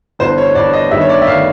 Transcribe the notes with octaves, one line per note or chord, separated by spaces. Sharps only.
G1 G2 E3 C5
C#5
G1 G2 E3 D5
D#5
G1 G2 D#3 E5
C#5
D5
E5
G1 D#3 F5